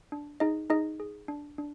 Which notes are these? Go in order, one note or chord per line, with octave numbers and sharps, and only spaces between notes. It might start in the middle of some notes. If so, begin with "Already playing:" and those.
D4
D#4 G#4 D#5
D#4 G#4 D#5
G#4
D4
D4